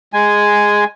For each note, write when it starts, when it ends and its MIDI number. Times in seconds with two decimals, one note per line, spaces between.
0.13 0.84 56
0.13 0.84 80